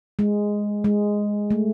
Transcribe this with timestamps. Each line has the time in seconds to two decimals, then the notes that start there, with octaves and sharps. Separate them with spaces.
0.19 G#3
0.84 G#3
1.51 A3